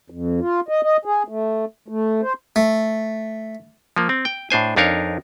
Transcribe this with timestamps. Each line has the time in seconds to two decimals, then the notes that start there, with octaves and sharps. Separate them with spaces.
0.10 F2
0.41 F4
0.68 D#5
0.83 D#5
1.05 G#4
1.28 A3
1.88 A3
2.22 C5
2.56 A3
3.96 F3 A#3
4.09 C4
4.25 G5
4.50 A2 D4 C5 G#5
4.76 F2 D4 D#4 A#4 C#5 F5